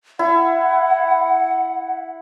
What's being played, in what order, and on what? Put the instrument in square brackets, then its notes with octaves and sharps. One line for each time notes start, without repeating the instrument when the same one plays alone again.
[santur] E4 [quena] F#5